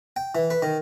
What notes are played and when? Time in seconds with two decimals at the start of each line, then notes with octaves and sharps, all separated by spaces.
0.16 G5
0.35 E3
0.50 B4
0.62 D#3